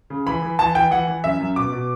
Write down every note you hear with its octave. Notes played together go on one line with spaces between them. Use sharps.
C#3
E3 B5
E3
E3 A5
E3 G5
E3 F#5
E3
F#2 E5
F#2
B2 D6
B2